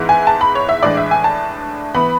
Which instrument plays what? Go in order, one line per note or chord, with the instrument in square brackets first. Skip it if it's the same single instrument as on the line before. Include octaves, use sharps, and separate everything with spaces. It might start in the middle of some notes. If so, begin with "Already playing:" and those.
Already playing: [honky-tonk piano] G#2 E3 B3 E4
G#5
A5
B5
C#5
E5
A2 E3 G#3 D4 D5
E5
G#5
A5
E3 B3 B5